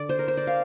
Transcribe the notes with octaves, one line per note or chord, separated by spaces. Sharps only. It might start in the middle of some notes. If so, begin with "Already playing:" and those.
Already playing: D3 D5
C5
A#4
C5
D5
F5